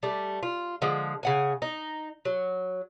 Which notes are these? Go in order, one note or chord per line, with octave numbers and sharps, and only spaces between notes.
G3 A3
F4
D3 F3 G#3
C#3 F#5 G#5
D#4
F#3